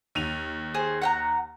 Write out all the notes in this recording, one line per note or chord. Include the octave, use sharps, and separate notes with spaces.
D#2 D#7 F7
G#4 C5
F#5 G5 A#5